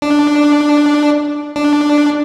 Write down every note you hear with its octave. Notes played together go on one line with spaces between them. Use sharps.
D4
D4